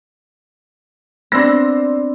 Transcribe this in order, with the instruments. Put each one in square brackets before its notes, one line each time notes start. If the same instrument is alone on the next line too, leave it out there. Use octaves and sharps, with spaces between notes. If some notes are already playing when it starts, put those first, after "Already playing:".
[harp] B3 C4 D4 [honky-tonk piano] C6 E6 A#6